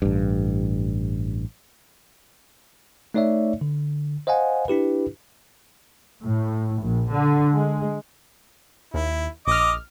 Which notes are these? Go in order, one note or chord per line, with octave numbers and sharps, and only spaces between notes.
A1 G2
A3 D#4 C#5 D5 E5
D3
C5 D#5 F5 F#5 G#5
D4 E4 G4 B4
A2
A#1
D3
G#3
D#2 E4
A#1 D#5 D6 F6